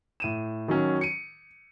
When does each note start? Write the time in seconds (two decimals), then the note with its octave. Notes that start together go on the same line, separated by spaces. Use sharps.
0.20 A2 D#7 E7
0.68 D#3 F#3 C#4
1.01 C#7 D#7